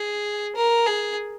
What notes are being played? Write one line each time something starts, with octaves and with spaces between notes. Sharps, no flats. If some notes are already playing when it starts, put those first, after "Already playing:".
Already playing: G#4
A#4
G#4